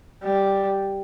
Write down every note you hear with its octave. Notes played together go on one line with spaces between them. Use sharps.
G3